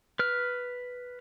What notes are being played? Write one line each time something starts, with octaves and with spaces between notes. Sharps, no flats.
B4 F6